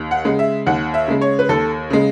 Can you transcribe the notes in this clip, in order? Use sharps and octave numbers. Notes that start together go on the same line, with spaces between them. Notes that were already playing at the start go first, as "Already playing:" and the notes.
Already playing: D#2
F#5
C#3 G#3
E5
D#2 F#5
E5
C#3 G#3
C#5
B4
D#2 A4
C#3 G#3